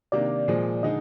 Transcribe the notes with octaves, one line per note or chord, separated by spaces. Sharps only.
C3 D#3 A#3 D4 D5
A#2 F3 G#3
D3 G#3 D#4 D#5